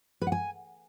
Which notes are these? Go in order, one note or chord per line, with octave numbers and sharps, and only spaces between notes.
B4
F#5
G#5